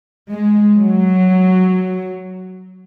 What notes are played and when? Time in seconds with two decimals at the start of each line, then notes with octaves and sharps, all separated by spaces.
0.30 G#3
0.77 F#3